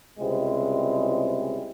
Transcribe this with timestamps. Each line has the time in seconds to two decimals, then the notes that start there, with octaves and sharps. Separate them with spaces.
0.19 C#2 C3 G3 G#3 C4 E4